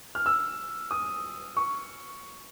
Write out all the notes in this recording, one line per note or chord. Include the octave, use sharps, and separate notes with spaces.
F6
E6
D#6
C#6